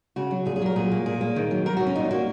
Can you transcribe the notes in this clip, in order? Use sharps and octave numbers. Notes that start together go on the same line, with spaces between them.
C#3 F#4
F#3
A#2 G#4
G#4
F#3 A#4
A#2 G#4
A#3
A#2 G#4
A#3
D#3
F#3
D#3 A#4
F#4
F#3
C#4
A#2 D#4
A#3 F#4